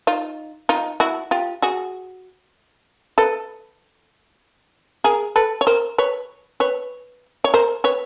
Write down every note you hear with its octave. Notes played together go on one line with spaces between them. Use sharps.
D#4 F4
D#4 F4
E4 F#4
F4 G4
F#4 G#4
A4 B4
G#4 A#4
A4 B4
C#5
A#4 C5
B4 C#5
B4 C#5
C#5
A#4 C5
B4 C#5